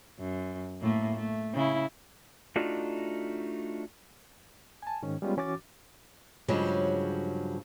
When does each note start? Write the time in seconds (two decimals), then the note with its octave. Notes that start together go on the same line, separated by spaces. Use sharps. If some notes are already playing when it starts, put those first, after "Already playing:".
0.19 F#2
0.81 A2 A3 A#3
1.15 A3
1.54 C#3 E4
2.56 A3 D4 D#4 F4 F#4
4.82 G#5 A5
5.02 G#2 D#3 C#4
5.22 G3 G#3 B3 C#4 F4
5.37 E3 C#4 F#4 D6 A6
6.48 G2 C#3 F3 F#3 G#3